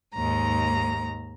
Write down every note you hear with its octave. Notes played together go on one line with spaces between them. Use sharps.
D#2 G#2 A#5